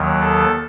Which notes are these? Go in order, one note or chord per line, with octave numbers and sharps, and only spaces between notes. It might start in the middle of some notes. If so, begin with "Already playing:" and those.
Already playing: D#2 D#3 F#3
A4